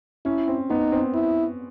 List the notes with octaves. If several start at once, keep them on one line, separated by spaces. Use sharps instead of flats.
C#4 E4
C4
B3 D#4
C4
E4